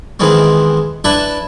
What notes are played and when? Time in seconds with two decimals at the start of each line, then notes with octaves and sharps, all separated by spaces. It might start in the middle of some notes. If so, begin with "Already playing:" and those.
0.20 D#3 E3 G#3 B3 C4
1.04 D4 E4 B4 E5 A5 D6